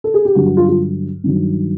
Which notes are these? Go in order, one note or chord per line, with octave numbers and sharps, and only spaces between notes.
A4
G#4
G4
G2 D3 F#3 F#4
F#4
F4
F4
G2 D#3 F#3